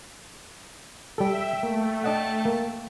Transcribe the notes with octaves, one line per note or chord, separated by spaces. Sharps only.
G3 A4 E5 G5
A3 A#3
D4 D#5 F#5 G5 A5
A#3